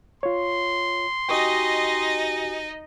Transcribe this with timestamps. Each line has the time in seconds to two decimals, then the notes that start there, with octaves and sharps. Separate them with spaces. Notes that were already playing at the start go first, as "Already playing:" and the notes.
0.23 F4 C#5 C6
1.29 D#4 F#4 G4 D#5 G5 G#5 C#6 D#6